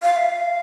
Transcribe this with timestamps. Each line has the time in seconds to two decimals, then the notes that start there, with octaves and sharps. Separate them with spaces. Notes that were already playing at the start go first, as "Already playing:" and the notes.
0.02 F5
0.16 E5
0.30 F5